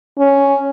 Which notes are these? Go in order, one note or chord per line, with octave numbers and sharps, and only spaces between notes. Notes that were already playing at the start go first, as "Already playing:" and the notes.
C#4